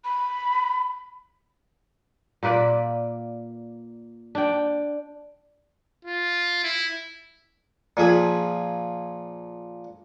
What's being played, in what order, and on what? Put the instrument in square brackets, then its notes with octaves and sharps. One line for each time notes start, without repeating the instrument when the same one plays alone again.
[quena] B5
[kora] A#2 A#3 B4 D5
D4 G5
[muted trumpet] F4
E4
[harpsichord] A#2 F3 G#4 B5